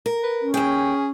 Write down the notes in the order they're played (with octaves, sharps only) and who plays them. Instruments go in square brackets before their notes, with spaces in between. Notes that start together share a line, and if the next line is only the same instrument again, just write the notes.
[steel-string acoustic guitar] A#4
[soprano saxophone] B4
[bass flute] C#4
[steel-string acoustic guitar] D#2 G5 [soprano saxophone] G#4